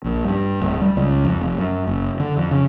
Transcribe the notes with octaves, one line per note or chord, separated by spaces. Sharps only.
A#1
G2
D1
G3
C#2
F2
F1
F#2
F#1
D3
F2
C#3